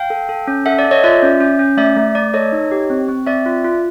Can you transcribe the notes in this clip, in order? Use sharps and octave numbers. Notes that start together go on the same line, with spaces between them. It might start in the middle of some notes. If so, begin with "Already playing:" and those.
Already playing: F5 G5
A4
A4
C#4
A4 E5 F#5
D5
A4
C#5 D#5
F4 D5 E5
C#4
C#4
C#4
A3 D5 E5
A3
A3 D5
A4 C#5 D#5
D#4
G4
C4
C4
C4 D5 E5
F4
F4